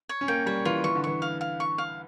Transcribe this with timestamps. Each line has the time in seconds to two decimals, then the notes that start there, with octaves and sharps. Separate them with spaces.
0.09 C#5
0.21 C#4
0.28 A#3 G5
0.46 G3 C#5
0.65 E3 F4
0.84 E3 C#6
0.95 D3
1.04 E3 C#6
1.22 F5
1.41 F5
1.60 C#6
1.78 F5